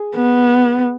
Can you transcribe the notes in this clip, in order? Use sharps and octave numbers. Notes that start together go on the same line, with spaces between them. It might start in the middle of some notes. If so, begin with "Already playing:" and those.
Already playing: G#4
B3